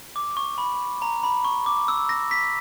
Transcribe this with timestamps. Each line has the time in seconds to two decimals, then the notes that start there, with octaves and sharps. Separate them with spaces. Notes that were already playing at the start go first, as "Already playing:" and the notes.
0.16 D6
0.37 C#6
0.58 B5
1.02 A#5
1.23 B5
1.45 C#6
1.66 D6
1.88 E6
2.09 A#6
2.31 B6